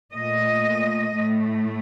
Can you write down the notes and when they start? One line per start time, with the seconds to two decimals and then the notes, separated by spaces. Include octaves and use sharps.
0.12 A#2 A3 D#5
1.14 A2 A3